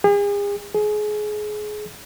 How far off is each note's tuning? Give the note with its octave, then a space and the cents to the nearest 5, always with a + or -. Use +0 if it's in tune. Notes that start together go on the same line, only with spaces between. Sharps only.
G#4 -40
G#4 +25